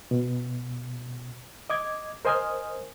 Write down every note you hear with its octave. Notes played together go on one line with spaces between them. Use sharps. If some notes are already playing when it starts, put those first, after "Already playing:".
B2
D#5 D6 G#6
A#4 C5 D#5 G#5 D#6 F6